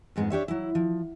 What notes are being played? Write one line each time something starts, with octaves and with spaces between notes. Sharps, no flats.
F2 G#2 G#3 B3
D4 G4 C#5 E5
F#3 E4
F3